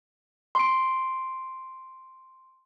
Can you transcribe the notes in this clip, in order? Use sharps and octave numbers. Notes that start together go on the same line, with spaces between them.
C6 D7